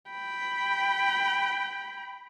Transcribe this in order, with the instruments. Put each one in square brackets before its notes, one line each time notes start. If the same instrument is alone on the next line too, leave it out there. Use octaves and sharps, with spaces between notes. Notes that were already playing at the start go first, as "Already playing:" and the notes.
[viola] G5 B5